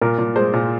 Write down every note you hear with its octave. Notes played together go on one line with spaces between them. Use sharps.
A#2 A#4
A#2
G#3 C5
A#2